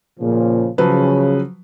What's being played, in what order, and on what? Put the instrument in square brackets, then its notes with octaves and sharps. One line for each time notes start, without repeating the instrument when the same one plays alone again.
[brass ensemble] A#2 C#3 F3
[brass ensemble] C#3 [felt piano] F3 F#3 B4